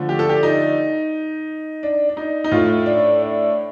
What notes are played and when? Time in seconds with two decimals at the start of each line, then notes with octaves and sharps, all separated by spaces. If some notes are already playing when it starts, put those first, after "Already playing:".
Already playing: D3 F3 A3
0.09 G4
0.19 A4
0.29 G4
0.43 D#4
1.83 D4
2.09 D4
2.17 D#4
2.44 D#4
2.51 A2 A3 F4
2.86 D4
3.22 D4